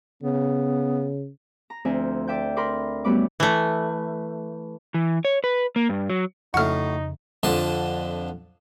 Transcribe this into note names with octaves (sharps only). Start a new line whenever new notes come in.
C#3 B3
A#5
D2 F3 C4 C5 E5 G#5
D5 E5 G5 G6
A#4 B5 C6 D6
F#2 G3 A3 B3 B5 D6
E3 A3
E3
C#5
B4
A#3
G2
F#3
F2 A2 C#3 D#4 F#4 F#5 F6
F2 D3 A5 C6